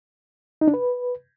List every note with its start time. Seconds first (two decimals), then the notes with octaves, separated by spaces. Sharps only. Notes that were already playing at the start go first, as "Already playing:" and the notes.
0.61 D#4
0.68 D4
0.74 B4